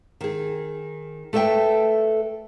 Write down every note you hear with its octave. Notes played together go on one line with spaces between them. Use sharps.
D#3 G#4
A3 A4 B4 E5 G5 A5